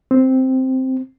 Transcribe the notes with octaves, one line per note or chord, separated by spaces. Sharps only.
C4